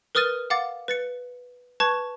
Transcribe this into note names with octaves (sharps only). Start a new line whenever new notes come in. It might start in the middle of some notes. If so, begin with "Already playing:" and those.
A#4 B4 D#6 F6 A6 D#7
F5 F#5 D6 A6
B4 A6 C#7
B4 A5 C#6 G#6